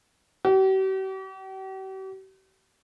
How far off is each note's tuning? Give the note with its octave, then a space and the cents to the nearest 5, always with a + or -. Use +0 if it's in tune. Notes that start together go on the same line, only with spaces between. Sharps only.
G4 -45